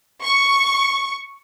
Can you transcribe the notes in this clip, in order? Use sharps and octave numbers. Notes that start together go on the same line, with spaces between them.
C#6